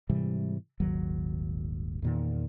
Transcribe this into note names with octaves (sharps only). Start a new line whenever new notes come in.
G#2 C3 E3 G3
D#1 G#1 D#2 F#3
E2 A#2 D#3